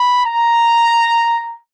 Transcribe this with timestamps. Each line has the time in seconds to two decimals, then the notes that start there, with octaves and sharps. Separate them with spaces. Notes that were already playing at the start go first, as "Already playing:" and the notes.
Already playing: B5
0.26 A#5